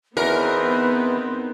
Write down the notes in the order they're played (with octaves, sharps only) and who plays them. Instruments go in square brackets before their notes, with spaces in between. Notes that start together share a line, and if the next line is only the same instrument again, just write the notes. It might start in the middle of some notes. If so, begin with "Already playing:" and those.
[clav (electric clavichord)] E2 [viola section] B3 C4 D#4 [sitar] A#4 [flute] B4